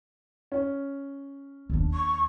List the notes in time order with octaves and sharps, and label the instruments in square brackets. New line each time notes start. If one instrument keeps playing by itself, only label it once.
[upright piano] C#4
[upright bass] D#2 D4
[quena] C#6